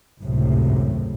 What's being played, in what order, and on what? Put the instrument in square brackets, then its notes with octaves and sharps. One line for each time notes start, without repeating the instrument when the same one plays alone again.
[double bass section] G#1 C#2 F#2 A2 C3